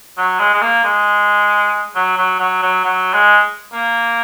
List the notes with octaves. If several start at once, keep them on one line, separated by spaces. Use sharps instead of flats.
F#3
G#3
G#3
A#3
G#3
F#3
F#3
F#3
F#3
F#3
G#3
A#3